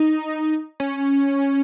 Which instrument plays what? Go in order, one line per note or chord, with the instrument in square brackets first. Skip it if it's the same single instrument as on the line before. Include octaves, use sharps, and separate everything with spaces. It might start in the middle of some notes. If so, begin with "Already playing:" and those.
Already playing: [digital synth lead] D#4
C#4